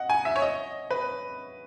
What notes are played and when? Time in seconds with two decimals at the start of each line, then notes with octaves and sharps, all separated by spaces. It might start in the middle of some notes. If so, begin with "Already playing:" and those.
Already playing: D#5 F#5
0.10 G#5
0.25 E5
0.36 C#5
0.42 D#5
0.91 B4